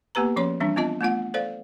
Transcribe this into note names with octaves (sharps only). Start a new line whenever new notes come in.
A#3 B3 G4 B4 A#5
F3 C#4 C#5 C6
E3 G3 C4 D4
B3 C4 F4 D#5 A5
A3 B3 F4 F#5
A4 C5 D5 F5